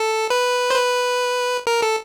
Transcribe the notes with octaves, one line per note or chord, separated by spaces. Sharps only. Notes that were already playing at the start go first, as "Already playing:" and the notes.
Already playing: A4
B4
C5
B4
A#4
A4